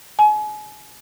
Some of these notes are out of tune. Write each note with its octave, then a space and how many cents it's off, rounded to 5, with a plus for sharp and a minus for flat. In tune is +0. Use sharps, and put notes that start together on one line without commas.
G#5 +35